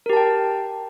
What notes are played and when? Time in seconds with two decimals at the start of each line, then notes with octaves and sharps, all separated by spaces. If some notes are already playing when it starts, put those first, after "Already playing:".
0.06 A#4
0.10 G4
0.13 A5
0.17 G5